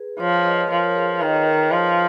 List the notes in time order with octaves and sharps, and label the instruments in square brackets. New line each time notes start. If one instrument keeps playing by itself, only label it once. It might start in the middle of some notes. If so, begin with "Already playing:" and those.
Already playing: [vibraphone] G#4 B4
[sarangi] F3 [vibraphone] C#5 F5
[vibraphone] B4 D#5
[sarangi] F3 [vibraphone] A#4 C#5
[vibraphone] G#4 B4
[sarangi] D#3 [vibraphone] B4 D#5
[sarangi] F3